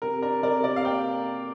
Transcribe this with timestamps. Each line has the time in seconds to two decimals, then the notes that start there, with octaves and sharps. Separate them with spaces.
0.02 C3 A#4
0.22 D4 A#4
0.43 C3 A#4 D5
0.64 C3 A#4 D5
0.76 F5
0.84 A#3 D5 G5